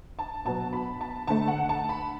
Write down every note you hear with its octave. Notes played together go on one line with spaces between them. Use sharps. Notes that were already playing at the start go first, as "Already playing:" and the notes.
A5
B2 F#3 B3 A5
B5
A5
D3 A3 A5
F#5
A5
B5